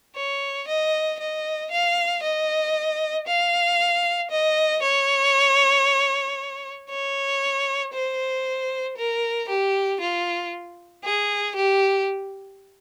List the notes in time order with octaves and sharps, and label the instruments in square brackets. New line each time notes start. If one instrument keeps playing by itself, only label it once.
[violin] C#5
D#5
D#5
F5
D#5
F5
D#5
C#5
C#5
C5
A#4
G4
F4
G#4
G4